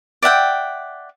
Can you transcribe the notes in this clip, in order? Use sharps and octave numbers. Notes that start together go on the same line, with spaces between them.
D5 E5 F#5 G5